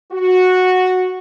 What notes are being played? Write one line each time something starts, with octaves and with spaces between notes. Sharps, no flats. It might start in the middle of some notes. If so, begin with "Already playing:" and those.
F#4